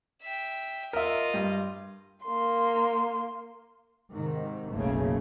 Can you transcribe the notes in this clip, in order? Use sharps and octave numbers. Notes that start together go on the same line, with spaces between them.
E5 G5
F4 A#4 D#5 E5
G2
A#3 C6
G#2 C3 D#3
F#1 B1 C#3 A3 A#3